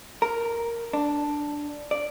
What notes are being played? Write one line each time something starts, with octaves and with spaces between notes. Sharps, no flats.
A#4
D4
D5